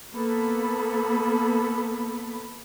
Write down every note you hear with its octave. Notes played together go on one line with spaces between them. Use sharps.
A#3 B3 A4 B5